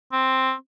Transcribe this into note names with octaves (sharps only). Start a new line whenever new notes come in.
C4